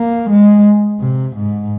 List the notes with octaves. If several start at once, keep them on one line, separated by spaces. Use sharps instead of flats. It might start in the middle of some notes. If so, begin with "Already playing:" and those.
Already playing: A#3
G#3
C3
G#2